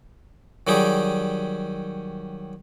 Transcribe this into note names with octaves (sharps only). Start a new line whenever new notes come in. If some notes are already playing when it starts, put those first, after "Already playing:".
D#3 F#3 G3 G4 G#4